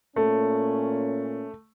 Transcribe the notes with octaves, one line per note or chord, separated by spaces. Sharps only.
A#2 A3 C#4